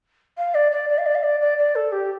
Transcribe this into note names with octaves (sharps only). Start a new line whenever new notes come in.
F5
D5
D5
D5
F5
D5
F5
D5
D5
D5
A4
G4